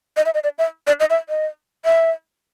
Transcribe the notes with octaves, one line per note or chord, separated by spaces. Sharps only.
D#5
E5
D#5
D5
E5
D5
D#5
E5
D#5
E5